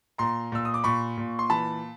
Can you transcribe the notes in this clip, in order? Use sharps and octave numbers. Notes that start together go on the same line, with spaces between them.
A#2 A#5 C6
A#2 E6
D#6
D6
A#2 B5 C#6
A#2
C6
E3 A5 B5